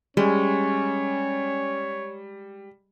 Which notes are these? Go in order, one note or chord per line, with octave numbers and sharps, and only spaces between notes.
G3 G#3 C#4 C#5